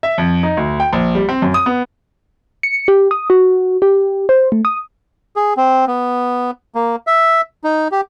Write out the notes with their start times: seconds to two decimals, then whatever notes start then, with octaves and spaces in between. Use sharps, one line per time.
0.03 E5
0.18 F2
0.43 D#4
0.57 D2
0.80 G5
0.93 A#1
1.15 G3
1.29 C4
1.42 F#2
1.54 D#6
1.66 B3
2.63 C#7
2.88 G4
3.11 D#6
3.30 F#4
3.82 G4
4.29 C5
4.52 A3
4.65 D#6
5.36 G#4
5.57 C4
5.87 B3
6.75 A#3
7.07 E5
7.64 D#4
7.92 G4